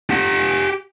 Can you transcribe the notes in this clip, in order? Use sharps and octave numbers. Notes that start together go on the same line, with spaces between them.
G4 F#5